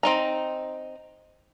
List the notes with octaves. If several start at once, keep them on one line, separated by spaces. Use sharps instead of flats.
C4 D#4 A#5